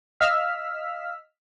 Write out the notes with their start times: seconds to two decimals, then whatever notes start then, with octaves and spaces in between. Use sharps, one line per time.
0.20 D#5 F5 E6 F6 B6